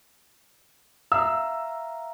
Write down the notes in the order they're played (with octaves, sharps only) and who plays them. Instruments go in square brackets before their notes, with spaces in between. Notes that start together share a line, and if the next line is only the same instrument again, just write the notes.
[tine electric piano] E5 F5 A#5 [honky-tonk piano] E6